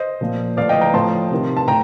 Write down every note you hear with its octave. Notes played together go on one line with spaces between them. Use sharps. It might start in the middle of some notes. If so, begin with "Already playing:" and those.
Already playing: C5 D#5
A#2 F3
A2 F3 D5 F5
D#5 G5
G5 A#5
A2 F3 A5 C6
C3 D#3
A5
A2 G5 A#5